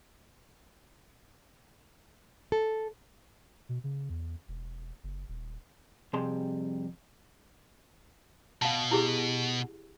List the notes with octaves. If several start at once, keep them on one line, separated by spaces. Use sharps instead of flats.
A4
B2
C#3
E2
E1
F#1
D#1
F2 C3 G3 G#4 A5 C6
B2 F5 A5
E4 G4 G#4